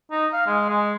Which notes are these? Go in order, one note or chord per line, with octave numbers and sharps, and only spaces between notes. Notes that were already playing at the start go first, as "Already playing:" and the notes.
D#4
F5
G#3
G#3